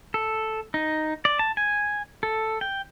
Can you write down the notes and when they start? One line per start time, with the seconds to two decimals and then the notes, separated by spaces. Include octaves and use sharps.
0.14 A4
0.74 D#4
1.25 D5
1.39 A5
1.57 G#5
2.23 A4
2.61 G5